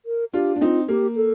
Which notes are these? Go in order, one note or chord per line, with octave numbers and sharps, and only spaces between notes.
A#4
D4 F4 G4
D4
C4 D#4 F4
A#3 G4
A4